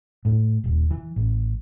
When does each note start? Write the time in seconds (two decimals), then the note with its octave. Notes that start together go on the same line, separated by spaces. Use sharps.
0.25 A2
0.64 D#1
0.91 E3
1.16 A1